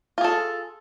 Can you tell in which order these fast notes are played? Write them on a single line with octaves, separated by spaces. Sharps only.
F4 G#4 A4